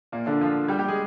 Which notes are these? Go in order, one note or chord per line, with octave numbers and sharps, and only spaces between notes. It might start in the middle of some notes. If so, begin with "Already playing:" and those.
A#2 A#3
D3 D4
F3 F4
G3 G4
G3 G4
G#3 G#4